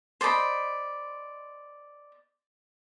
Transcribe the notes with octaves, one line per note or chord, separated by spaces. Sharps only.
C5 D5 D#5 B5